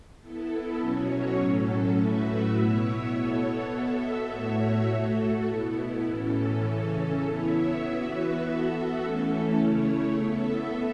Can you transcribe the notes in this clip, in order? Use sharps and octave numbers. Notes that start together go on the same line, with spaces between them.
B3 E4 A4
B2 F#3 C#4 F#4 C#5
A2 F#3 C#4 A4
A2 A3 F#4 B4 E5
B2 B3 E4 C#5 E5
B2 B3 A4 C#5
B2 B3 A4 E5
A2 A3 F#4 C#5 E5
A3 F#4 A4
B2 B3 E4
A2 E3 C#4 A4
C#3 E3 C#4 A4
B3 E4 C#5 E5
E3 B3 F#4 B4 E5
B3 F#4 A4 E5
E3 A3 C#4 A4
C#3 A3 E4 C#5
B3 A4 E5